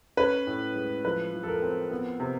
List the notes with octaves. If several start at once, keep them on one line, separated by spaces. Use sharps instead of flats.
C#4 B4
A2
G#3
F3 B4
F3
A4
A#4
C4
B3
C3